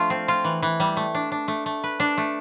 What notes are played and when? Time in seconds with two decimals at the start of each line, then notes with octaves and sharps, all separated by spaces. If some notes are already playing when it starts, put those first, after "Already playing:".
Already playing: F3 A3 D4 F4
0.10 C4
0.28 F4
0.44 E3
0.62 E3
0.80 G3
0.97 A3
1.15 D4
1.32 D4
1.48 A3
1.66 A3
1.84 B4
2.00 D4
2.17 A3